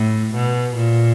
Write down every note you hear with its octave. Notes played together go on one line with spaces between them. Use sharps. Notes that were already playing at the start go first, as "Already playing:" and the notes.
Already playing: A2
B2
A#2